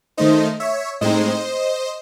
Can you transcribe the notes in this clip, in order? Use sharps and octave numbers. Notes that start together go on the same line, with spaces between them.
D#3 A3 D#4 C5 D#5
C#5 E5
A2 G#3 C4 D#4 C5 D#5